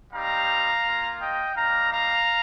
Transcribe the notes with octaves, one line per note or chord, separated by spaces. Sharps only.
G3 C4 D#4 G4 F5 A#5
A#3 F4
D#5 G5
G3 A#3 D#4 F5 A#5
F5 A#5